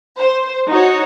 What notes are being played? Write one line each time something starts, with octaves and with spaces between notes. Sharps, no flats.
C5
D#4 F#4 C#5